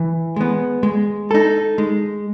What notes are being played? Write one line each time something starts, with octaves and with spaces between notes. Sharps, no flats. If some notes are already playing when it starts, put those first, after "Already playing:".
Already playing: E3
G#3 B3
G#3
D#4 A4
G#3